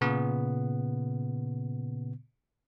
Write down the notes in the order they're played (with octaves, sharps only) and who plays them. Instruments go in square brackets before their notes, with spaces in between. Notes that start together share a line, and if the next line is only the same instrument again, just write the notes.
[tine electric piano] A#2 C#3 B3